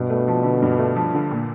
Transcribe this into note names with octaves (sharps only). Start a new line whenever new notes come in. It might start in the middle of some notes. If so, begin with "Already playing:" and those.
Already playing: G2 B2
A3
F3
D3
G2
A3
F3
D3
A#2